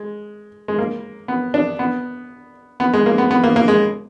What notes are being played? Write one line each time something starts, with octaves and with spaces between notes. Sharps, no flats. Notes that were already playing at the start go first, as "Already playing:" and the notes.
Already playing: G#3
G#3
A#3
B3
D4
B3
B3
G#3
A#3
B3
B3
A#3
A#3
G#3